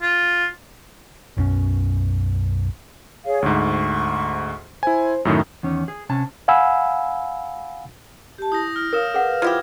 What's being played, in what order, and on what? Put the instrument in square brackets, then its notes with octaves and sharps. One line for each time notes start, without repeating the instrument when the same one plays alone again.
[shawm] F4
[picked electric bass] B1 F#2 B2 C#4
[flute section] G#4 C#5 F5
[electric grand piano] D2 G#2 [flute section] C#6
[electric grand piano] E4 G#5 [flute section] C5
[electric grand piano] F#2 A2 D#3
[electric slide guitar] E2 D#3 C#4
G#4
C3 C#4 A5
[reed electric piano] F5 F#5 G#5 B5 E6
[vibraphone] G4 A5
[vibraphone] E4 [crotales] D#6 G6 A#6
[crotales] F6 A#6
[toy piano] A#4 [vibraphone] C#5 F5 [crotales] D#6 F6 E7
[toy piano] G#4 F#5 [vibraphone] B4 F5
[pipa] F3 E4 G4 [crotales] G#6